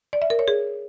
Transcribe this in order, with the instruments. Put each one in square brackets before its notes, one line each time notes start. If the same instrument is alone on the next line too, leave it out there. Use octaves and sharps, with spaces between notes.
[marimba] D5
E5
A#4
C#5
G#4